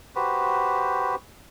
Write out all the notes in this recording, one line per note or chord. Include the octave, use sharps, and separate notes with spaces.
F#4 G4 B4 C5